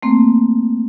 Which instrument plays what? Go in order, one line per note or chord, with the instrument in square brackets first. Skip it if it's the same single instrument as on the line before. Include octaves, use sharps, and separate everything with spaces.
[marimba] A3 A#3 C4